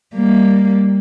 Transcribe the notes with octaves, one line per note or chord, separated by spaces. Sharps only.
G3 A#3